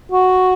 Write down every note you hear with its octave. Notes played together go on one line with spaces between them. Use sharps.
F#4